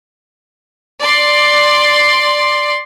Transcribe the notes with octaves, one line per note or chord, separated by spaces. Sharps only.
D5 C6